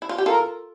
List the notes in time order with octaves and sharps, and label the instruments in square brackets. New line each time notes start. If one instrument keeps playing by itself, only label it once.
[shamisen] E4
F4
G4
[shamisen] F4 A4 [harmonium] A#4